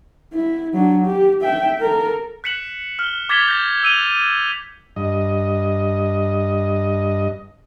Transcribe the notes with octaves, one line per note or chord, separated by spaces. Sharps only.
E4
F#3 D4
G4
E5 G5
A4 A#4
F#6 B6 C#7 E7 F#7
F6 G7
D6 G#6 A6 B6 F7 G7
G6 A#6
E6 D#7 F7 G7
G2 D#5